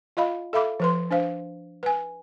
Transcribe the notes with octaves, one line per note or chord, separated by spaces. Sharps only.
F4 D#5 F5 B5
A4 E5 F5 B5 D6
F3 B4 C6
D4 C5 F5
B4 G#5